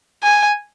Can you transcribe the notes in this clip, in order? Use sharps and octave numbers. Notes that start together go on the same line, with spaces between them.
G#5